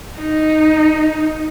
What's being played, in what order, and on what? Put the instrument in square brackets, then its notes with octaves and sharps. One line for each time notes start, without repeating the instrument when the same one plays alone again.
[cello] D#4